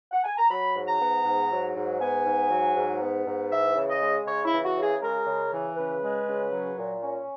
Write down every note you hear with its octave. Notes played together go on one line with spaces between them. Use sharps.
F#5
G#5
A#5
F#3 B5
G#2
A#5
B3
G#2
F#3
G#2
B3 G#5
G#2
F#3
G#2
B3
G#2
E3 E5
C#3
D#5
G#3
C#3 C#5
E4
E3
F#4
C#3
G#4
G#3 A#4
C#3
E3
C#3 B4
G#3
C#3
F#3
A#2
C#4